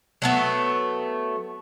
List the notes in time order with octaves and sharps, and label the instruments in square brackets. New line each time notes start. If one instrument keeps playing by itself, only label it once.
[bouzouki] F#3 A3 B3